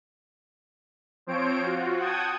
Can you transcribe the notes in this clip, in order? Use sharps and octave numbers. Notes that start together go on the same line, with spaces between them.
F3 C4 C5 C#5 D7
F4 F#4
F#5 G5 A5 D#6 G#6